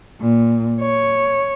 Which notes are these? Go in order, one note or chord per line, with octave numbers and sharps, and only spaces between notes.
A#2
C#5